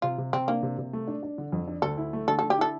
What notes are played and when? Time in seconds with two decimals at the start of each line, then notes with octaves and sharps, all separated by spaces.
0.02 C3 F4
0.18 C3
0.33 C3 C4
0.48 A#3 D4
0.63 C3
0.78 C3
0.93 A3
1.07 D4
1.23 D4
1.38 D3
1.52 F2
1.67 D4
1.82 D2 A4
1.97 E4
2.13 A3
2.28 D3 A4
2.39 D3 A4
2.50 G4
2.58 E4 A4